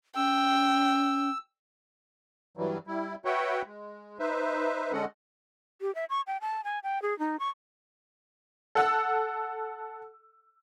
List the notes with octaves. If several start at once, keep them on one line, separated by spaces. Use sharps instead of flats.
C#4 G5 E6
G2 E3 F#3 G3
G3 E4
F#4 B4 C#5 E5 F#5 G5
G#3
D#4 B4 C5 E5
D3 G#3 C#4 A4 D#5 F#5
G4
E5
C#6
G5
A5
G#5
G5
G#4
D#4
C#6
A4 F#5 E6